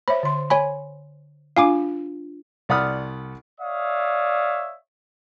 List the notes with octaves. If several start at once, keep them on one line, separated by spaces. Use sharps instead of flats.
C5 C#5 E5 B5
D3 C6
C#5 G#5 B5
D4 F4 F5 G#5 D6
C2 D5 F#5 B5 D#6 F6
C#5 D5 E5 F5 D#6